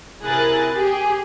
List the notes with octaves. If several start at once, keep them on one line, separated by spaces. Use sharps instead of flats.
C3 E4 G#4 A#4 F#6 A6
G4 G#4